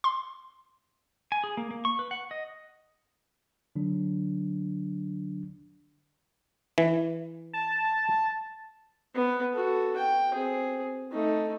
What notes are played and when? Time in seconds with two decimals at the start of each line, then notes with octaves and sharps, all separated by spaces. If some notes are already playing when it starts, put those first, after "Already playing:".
0.04 C6
1.32 G#5
1.44 G#4
1.57 A#3
1.71 A#3
1.85 C#6
1.99 B4
2.11 F#5
2.31 D#5
3.76 D3 F#3 D4
6.78 E3
7.53 A5
9.14 B3 B4
9.53 F#4 A4
9.97 G5
10.33 C4 G#4
11.12 A3 D#4